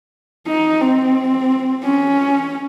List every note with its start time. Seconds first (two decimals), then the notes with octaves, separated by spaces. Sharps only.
0.47 D#4
0.81 C4
1.83 C#4